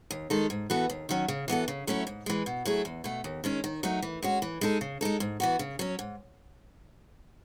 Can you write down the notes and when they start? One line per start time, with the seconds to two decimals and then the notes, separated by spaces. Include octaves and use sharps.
0.11 D#2
0.30 D#3 G#3 D#4 A4
0.50 G#2
0.70 E3 B3 F#4 A4
0.90 D#2
1.09 D#3 F#3 C#4
1.28 C#3
1.48 E3 B3 F#4 A4
1.68 C#3
1.87 F#3 A3 C#4 E4
2.07 G#2
2.26 E3 G#3
2.46 B2
2.65 F#3 A3 E4 G#4
2.85 E2
3.04 B2 A3
3.24 D#2
3.44 D#3 G#3 C#4
3.64 D#3
3.83 F#3 A3 D#4
4.02 E3
4.23 G#3 C#4 F#4
4.42 E3
4.61 G#3 D#4 A4
4.81 C#3
5.01 G#3 D#4 A4
5.20 G#2
5.40 E3 B3 F#4
5.59 C#3
5.79 F#3 C#4
5.99 G#2